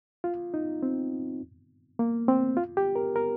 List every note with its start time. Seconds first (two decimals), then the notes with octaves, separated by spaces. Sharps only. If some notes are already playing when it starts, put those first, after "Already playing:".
0.24 F4
0.54 D#4
0.82 C4
1.99 A#3
2.28 C4
2.57 F4
2.77 G4
2.96 A#4
3.16 A#4